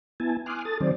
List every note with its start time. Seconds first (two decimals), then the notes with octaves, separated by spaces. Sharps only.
0.20 B3 E4 G#5 A5
0.46 G#5 C6 D6 D#6 F6 F#6
0.65 A4 D#6 A6
0.80 D#3 F#3 C4 C5 D5